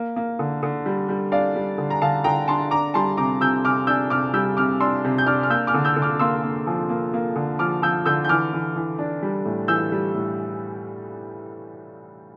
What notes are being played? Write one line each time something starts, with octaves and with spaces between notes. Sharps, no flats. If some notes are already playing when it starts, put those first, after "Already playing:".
Already playing: A#3
A#3
D3
D3
G3
G3
D4 D5 F5
G3
D3
A#5
D3 F5 A5
D3 G5 A#5
D4 A5 C6
D4 A#5 D6
G3 A5 C6
C3 A#5 D6
C3 E6 G6
C3 D6 F6
D4 E6 G6
C3 D6 F6
G3 E6 G6
C3 D6 F6
D4 C6 E6
C3
G6
D4 D6 F6
F6
A#3 E6 G6
D6 F6
D3
E6 G6
D3
D6 F6
A#3 C6 E6
A#3
F3
A#3
A#3
D3
F3 D6 F6
F3 E6 G6
D3 E6 G6
G6
E3 D6 F6
E3
E3
D4
G3
A2
E3 E6 G6
G3
A2